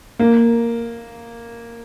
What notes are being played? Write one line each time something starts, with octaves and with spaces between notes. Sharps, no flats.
A#3